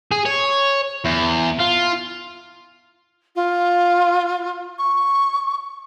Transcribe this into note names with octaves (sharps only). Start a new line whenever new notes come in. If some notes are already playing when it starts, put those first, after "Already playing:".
G#4
C#5
E2
F4
F4
C#6